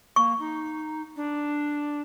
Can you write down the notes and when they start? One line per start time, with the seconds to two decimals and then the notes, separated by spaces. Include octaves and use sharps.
0.16 A#3 C#6
0.40 D#4
1.16 D4